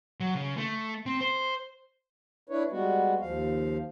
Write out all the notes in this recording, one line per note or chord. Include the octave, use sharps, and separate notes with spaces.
F#3
C#3
A3
C4
C5
D4 E4 B4 C#5
G3 G#3 B3 F#4
D#2 F3 F5